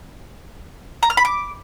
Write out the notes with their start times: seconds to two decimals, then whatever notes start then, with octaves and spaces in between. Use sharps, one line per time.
1.03 A#5
1.10 F6
1.17 B5
1.25 D6